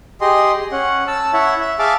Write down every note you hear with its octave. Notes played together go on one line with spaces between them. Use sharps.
G4 G#4 D#5 C6
C#4 F#5
A5 E6
E4 C#5 E5 F#5
E5
G#4 E5 F5 A5 D6